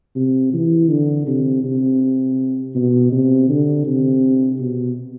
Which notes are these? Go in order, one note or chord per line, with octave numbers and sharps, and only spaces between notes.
C3
E3
D3
C3
C3
B2
C3
D3
C3
B2